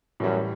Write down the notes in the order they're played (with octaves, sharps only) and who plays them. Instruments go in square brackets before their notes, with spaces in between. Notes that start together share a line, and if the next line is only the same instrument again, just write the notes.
[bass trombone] F#2 [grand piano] A2 E3 G3